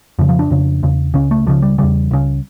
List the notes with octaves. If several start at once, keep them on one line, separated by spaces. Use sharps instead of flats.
F2 C#3 F3
F3
D4
F2 C#3
E2 C#3
C#2 C#3 C#4
A3
C#2 C#3 F3
G3
E2 C#3 G3
C#2 C#3